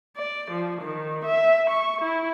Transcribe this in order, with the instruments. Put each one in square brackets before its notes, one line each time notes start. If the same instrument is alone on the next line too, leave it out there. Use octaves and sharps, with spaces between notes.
[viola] D5
F3
D#3
E5
C#6
E4